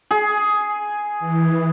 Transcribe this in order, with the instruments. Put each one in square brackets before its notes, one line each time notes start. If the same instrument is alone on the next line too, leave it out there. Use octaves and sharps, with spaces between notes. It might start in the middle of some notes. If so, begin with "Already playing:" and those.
[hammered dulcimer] G#4
[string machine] E3